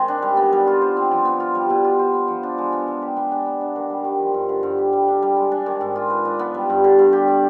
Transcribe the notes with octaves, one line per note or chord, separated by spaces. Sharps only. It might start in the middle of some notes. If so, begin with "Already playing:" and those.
Already playing: D#3 G#3 C4
D4
G3
B3
G3
F4
C5
C4
F3
B3
F4
G3
B2
F4
C5
B3
F3
D4
G#3
B3
G#3
G4
B3
D4
B3
D4
D#3
G3
D#3
F3
G2
D3
G2
G4
G3
D4
G3
G#3
D4
D#3
G#2
F4
B4
D4
B3
G3
G2
D3
G2
G4
D5